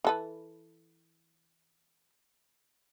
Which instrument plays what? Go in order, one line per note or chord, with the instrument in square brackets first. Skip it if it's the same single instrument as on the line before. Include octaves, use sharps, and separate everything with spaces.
[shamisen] E3 A4 B4